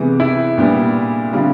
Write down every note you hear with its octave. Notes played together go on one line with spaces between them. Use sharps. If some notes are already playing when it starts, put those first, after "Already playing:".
Already playing: C3 E3 G#3 B3
E4
A#2 G3 B3 D4 G4
D3 G3 C4 F4